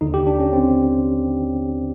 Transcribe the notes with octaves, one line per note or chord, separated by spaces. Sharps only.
D#2 D3 D#4
G4
D4
C#4
C4